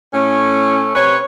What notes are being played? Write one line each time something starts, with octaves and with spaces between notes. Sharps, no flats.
A2 A3 C#4
C3 B4 C#5